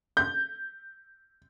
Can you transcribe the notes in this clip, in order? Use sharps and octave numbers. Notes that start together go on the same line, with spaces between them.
G6